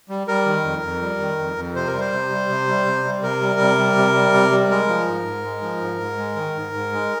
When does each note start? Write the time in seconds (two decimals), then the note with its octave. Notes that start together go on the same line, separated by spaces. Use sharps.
0.09 G3
0.27 G3 A#4
0.46 D#3
0.64 F2
0.83 F2
1.01 G3
1.20 D#3
1.38 F2
1.57 F2
1.75 C3 C5
1.88 A#4
1.94 G3
2.00 C5
2.12 C3
2.30 G3
2.49 C3
2.67 G3
2.86 C3
3.04 G3
3.22 C3 A#4
3.41 G3
3.60 C3
3.78 G3
3.97 C3
4.15 G3
4.34 C3
4.52 G3
4.70 G#3 A#4
4.88 F3
5.08 G#2
5.25 G#2
5.45 G#3
5.63 F3
5.81 G#2
6.00 G#2
6.18 G#3
6.36 D#3
6.55 G#2
6.73 G#2
6.92 G#3